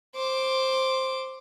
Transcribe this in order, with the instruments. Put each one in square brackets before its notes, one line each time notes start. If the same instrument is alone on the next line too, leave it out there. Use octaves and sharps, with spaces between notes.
[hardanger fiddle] C5 D6